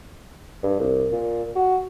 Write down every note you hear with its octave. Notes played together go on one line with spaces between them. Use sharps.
G2
C2
A#2
F#4